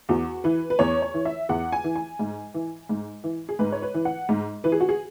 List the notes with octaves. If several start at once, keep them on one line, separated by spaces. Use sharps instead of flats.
E2 F#4
E3 B4
B4
E2 C#5
C#5
E3
E5
E2 F#5
G#5
E3
G#5
G#2
E3
G#2
E3
G#4
G#2 B4
C#5
B4
E3
F#5
G#2
E3 B4
G#4
F#4
G#4